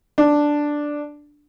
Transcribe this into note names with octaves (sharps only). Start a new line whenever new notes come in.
D4